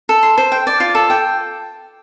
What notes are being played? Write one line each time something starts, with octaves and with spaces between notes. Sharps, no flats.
A4
C6
C5
G5
D5
F4
A4
G5